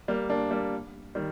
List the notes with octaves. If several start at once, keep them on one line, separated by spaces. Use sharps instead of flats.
G3 A#3
A#3 D4
G3 A#3
D#3 G3